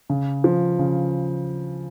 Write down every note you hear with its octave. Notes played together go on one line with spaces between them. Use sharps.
C#3
F3
C#3